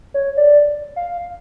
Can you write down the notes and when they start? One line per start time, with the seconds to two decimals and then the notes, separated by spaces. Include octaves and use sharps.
0.14 C#5
0.37 D5
0.96 F5